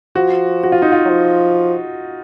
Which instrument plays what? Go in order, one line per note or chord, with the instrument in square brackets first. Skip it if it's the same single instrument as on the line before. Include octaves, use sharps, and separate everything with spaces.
[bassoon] F3 [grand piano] F#4
[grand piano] F#4
F4
D#4
F4
[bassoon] F#3
F3